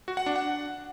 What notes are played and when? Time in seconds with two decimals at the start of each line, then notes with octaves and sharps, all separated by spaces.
0.08 F#4
0.17 F#5
0.26 D4
0.36 F#5